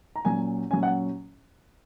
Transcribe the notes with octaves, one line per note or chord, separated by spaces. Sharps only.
A#5
A#2 F#3 C#4 G#5
A#2 F#3 C#4 G#5
F#5